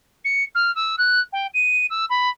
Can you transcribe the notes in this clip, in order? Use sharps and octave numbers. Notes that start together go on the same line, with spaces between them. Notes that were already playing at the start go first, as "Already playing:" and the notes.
C#7
F6
E6
F#6
G5
D#7
E6
B5